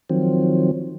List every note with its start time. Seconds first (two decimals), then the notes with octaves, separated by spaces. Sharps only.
0.10 D#3 F3 F#3 C4